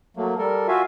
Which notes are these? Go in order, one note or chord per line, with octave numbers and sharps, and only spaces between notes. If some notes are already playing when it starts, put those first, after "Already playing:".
F#3 A3 A#3
G3 A4 A#4
F4 F#4 E5 F5 G#5